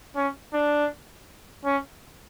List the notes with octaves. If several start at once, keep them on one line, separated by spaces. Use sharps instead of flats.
C#4
D4
C#4